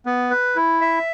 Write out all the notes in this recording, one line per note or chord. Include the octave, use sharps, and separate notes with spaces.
B3
B4
E4
E5